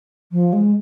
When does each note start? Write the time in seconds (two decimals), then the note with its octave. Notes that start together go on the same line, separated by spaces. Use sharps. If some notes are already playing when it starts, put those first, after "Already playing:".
0.32 F3
0.53 G#3